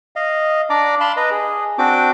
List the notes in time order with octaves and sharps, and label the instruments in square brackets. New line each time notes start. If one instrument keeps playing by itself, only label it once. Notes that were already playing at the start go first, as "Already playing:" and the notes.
[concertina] D#5 F5
D4 D5 A#5 D6
F5 A5 B5 C6
B4 D#5 A#5
G#4
C4 D4 F#4 G5 D6